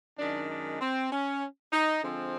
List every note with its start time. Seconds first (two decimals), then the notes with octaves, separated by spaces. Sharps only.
0.18 F#2 D#3 G#3 D4
0.50 D4
0.81 C4
1.11 C#4
1.72 D#4
2.03 D3 F3 G#3 C4